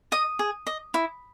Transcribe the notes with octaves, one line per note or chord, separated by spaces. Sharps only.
D#5 D#6
G#4
D#5
E4